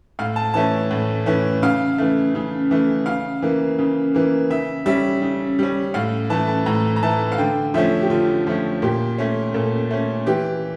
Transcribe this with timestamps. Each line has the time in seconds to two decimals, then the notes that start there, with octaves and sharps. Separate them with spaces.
0.19 A2 F5
0.36 A5
0.54 E3 A3 C#4 A5
0.91 A2
1.26 E3 A3 C#4
1.62 C#3 F5
1.98 E3 A3
2.35 C#3
2.71 E3 A3
3.06 C#3 F5
3.42 E3 A#3
3.79 C#3
4.14 E3 A#3
4.50 C#3 E5
4.86 G3 C#4 E5
5.22 C#3
5.59 G3 C#4
5.94 A2 F5
6.30 E3 A3 A5
6.48 A5
6.66 A2 A#5
6.96 A#5
7.02 E3 A3 A5
7.32 F5
7.38 D3 G5
7.74 F3 A3 C#4 E5
8.01 G4
8.10 D3 F4
8.47 F3 A3 C#4
8.82 A#2 G4
9.18 A3 C#4
9.54 A#2 A4
9.91 A3 C#4
10.26 E3 G4